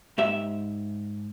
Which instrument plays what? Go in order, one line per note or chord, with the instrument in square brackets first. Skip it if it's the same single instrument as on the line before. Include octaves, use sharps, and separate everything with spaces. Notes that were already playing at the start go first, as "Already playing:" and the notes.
[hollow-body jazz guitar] G#2 G4 E5